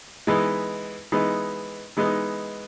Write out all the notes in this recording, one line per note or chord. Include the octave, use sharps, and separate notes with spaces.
E3 G#3 B3 D#4
E3 G#3 B3 D#4
E3 G#3 B3 D#4